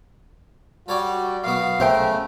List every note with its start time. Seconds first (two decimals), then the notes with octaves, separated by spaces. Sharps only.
0.88 G3 F#4 A4 C#5 D5
1.44 F#2 B2 B3 F5
1.80 B1 C#3 A3 A#4 C5 E5 G5